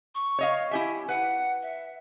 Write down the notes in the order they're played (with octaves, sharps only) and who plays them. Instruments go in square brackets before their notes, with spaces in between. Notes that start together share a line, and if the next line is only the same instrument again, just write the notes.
[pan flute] C#6
[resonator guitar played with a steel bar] C#5 D#5 F5
[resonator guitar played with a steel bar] E4 G4 E5 [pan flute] G#5
[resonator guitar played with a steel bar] B4 [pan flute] F#5
[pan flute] E5